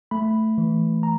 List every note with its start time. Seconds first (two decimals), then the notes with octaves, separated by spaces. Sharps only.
0.11 A3 B5
0.58 E3
1.03 A#5